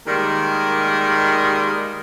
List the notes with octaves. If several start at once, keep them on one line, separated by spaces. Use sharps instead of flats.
D#3 G3 G#3 A#3